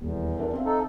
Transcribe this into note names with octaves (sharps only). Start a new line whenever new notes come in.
D#1 E2
D4 A#4 E5
C4 E5 F5
D#4 A4